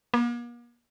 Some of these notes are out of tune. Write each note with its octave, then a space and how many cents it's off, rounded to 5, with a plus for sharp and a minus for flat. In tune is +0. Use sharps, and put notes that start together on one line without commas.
A#3 +45